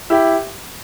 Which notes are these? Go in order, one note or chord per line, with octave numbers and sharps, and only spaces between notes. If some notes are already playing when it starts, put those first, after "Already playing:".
E4 G4